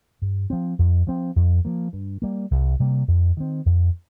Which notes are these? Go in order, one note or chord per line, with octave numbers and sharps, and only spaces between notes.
G2
F3 C4
F2
F3 C4
F2
F3 A#3
G2
G3 A#3
C2
C3 G3 A#3
F2
D#3 C4
F2